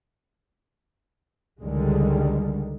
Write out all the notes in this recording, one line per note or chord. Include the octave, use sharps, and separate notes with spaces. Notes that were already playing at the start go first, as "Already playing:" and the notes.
C#2 D3 D#3 G3 G#3